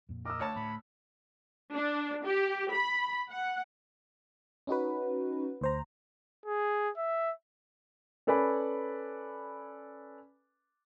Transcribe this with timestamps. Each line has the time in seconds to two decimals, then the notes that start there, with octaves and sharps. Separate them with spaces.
0.09 F2 A#2
0.25 A#4 D#5 D6 E6
0.40 D2 C#5 A5
0.56 A2 A3 B5
1.74 D4
2.25 G4
2.74 B5
3.30 F#5
4.67 C#4 D#4 F#4 B4
5.61 D2 C5 A#5
6.46 G#4
6.97 E5
8.27 C#4 A4 B4 D5 G#5 B5